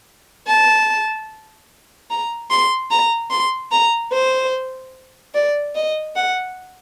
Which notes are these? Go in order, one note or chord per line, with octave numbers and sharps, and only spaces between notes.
A5
A#5
C6
A#5
C6
A#5
C5
D5
D#5
F#5